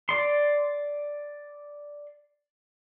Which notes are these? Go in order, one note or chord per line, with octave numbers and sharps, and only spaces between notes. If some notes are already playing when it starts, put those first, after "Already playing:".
D5 C6